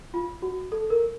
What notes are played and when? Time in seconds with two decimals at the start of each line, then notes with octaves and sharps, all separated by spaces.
0.14 F4
0.42 F#4
0.72 A4
0.90 A#4